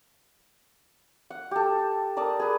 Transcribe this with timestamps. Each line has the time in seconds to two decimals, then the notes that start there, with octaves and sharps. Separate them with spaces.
1.30 F#5
1.51 G4 A4
2.17 A#4 D5 D#5 A5
2.40 G#4 B4